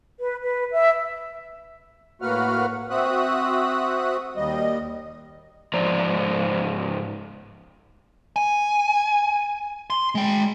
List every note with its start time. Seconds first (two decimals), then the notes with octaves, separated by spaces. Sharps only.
0.19 B4
0.41 B4
0.71 E5
2.22 A2 A#3 F#4 B4 F#5 F6
2.90 C4 F#4 E5 D#6 F#6
4.36 D#2 G3 D#5
5.73 G#2 F3 C5 D5 A#5
8.36 G#5
9.90 C6
10.15 G#3 G5